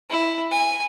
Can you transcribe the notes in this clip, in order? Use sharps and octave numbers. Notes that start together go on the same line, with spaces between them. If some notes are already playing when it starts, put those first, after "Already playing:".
E4
G#5